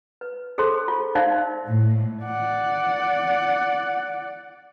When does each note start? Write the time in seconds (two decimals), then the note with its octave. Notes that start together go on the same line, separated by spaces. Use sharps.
0.21 B4
0.58 G#4 A4 C5 C6
0.88 F4
1.15 D#4 A#4 C5 D5 E5 F5
1.66 A2
2.23 D5 F#5